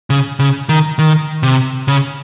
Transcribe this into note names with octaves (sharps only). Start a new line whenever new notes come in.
C#3
C#3
D#3
D#3
C3
C#3